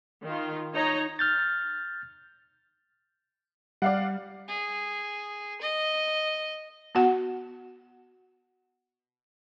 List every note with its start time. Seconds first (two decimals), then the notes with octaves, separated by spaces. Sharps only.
0.23 D#3 F4
0.74 D#4 C#5 A#5
1.19 F6 G6 A6
3.82 G3 D5 F5 F#5
4.48 G#4
5.61 D#5
6.95 B3 F#4 F#5